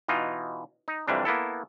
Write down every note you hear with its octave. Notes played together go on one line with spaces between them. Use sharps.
B2 E3 D#4 F4
D#4
F2 C3 E3 G3 D4
A#3 B3 E4 A4